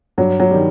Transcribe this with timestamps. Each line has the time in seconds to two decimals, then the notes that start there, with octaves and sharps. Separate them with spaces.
0.18 G2 F#3
0.40 F#3
0.51 D#3 G3